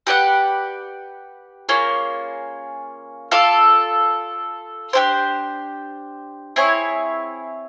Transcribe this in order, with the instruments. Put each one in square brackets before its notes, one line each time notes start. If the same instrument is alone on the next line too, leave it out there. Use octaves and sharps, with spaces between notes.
[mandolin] G4 B4 D5 F#5
A#3 C#4 F4 G#4
F4 A4 D5 F5
D4 G4 C5
C4 E4 G#4 C#5